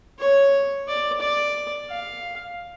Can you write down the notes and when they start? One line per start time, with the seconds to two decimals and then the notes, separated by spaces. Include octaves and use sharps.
0.19 C#5
0.88 D5
1.21 D5
1.90 F5